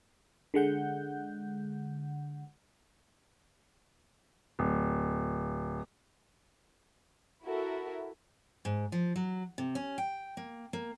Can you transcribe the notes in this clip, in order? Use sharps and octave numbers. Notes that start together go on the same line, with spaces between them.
D3 G#3 F#5 G6
D1
E4 F#4 A4 A#4 E5
G#2
F3
F#3
C3
C#4
G5
A#3
A#3